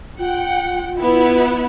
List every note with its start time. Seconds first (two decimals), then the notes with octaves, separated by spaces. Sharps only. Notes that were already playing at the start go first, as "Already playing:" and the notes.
0.19 F4 F#5 G5
0.97 B3 E4